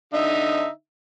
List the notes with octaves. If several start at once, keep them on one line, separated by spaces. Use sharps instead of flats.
D3 D#4 E5